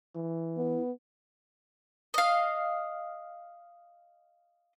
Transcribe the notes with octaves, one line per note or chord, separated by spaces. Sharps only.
E3
B3 E4
D#5 F5